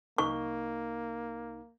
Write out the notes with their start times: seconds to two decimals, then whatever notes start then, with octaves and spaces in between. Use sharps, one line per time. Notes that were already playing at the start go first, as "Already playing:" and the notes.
0.18 C2 A#3 D#4 C#6